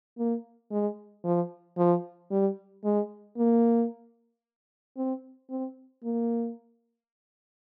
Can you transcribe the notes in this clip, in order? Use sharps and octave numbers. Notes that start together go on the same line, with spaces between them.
A#3
G#3
F3
F3
G3
G#3
A#3
C4
C4
A#3